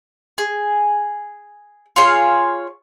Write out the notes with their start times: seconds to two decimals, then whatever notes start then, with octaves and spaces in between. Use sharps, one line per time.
0.38 G#4
1.96 F4 G#4 C#5 F5